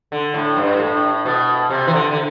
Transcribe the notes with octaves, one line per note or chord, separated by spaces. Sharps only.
D3
A2
G2
A2
B2
C3
E3
D3
D3